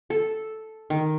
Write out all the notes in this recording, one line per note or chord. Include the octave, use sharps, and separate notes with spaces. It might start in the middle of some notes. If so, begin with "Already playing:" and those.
A4
D#3